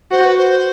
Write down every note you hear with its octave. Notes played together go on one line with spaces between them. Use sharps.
F#4 C5
B4
C5